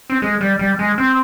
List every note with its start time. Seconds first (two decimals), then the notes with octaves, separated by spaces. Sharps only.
0.10 C4
0.22 G#3
0.41 G3
0.59 G3
0.79 G#3
0.98 C4